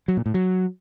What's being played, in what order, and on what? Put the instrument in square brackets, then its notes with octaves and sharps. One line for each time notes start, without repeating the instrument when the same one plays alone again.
[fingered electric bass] F#3
A#2
A2
F#3